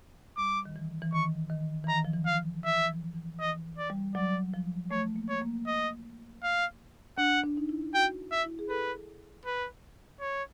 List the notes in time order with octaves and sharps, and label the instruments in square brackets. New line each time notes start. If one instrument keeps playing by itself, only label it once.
[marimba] G3 [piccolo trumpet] D6
[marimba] D#3
E3
E3
[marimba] D#3 [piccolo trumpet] C#6
[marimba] D#3
E3
[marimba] D#3 [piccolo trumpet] A#5
[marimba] F3
E3
[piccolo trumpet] F5
[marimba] F3
E3
[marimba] E3 [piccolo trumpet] E5
[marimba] E3
F3
E3
[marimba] E3 [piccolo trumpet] D#5
[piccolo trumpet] D5
[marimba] G3
[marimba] F#3 [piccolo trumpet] D5
[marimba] F3
[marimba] A3 [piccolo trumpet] C#5
[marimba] A#3
[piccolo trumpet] C#5
[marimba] A#3
[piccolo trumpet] D#5
F5
[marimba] D4 [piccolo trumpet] F#5
[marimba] D4
D#4
E4
[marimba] F#4 [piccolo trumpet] G5
[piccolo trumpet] E5
[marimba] E4
G#4
[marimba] A4 [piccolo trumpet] B4
[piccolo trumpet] B4
C#5